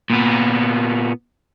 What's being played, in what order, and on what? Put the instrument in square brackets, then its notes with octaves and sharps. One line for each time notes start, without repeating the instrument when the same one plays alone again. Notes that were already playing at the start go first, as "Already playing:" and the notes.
[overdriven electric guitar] A#2 B3